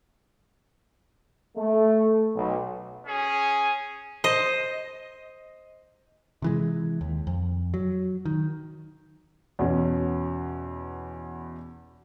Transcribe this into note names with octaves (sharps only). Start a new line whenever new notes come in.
A3
B1
C#4 G#4
C5 D#5
C3 E3 G#3
D#2
F2
F#3
D#3
E2 B2 C#4